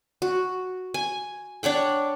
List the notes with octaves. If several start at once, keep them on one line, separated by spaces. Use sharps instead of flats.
F#4
G#5
D4 C#5 F#5 G5